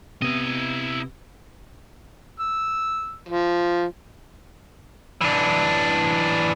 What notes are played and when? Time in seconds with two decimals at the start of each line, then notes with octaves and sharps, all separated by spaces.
0.22 C3 B3 E4 D#5
2.40 E6
3.29 F3
5.21 E3 D4